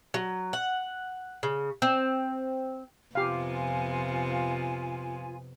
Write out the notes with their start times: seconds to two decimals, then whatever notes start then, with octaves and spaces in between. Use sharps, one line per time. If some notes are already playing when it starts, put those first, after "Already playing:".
0.14 F#3
0.53 F#5
1.43 C#3
1.82 C4
3.15 F2 C3 B3 F4 G4 F5 G#5